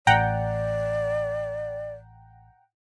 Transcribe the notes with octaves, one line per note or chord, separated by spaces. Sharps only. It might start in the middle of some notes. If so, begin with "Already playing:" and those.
A1 D5 F#5 G5 A#5